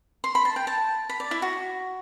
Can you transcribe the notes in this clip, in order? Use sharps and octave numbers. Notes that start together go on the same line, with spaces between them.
C6
B5
A5
G5
A5
B5
D5
E4
F#4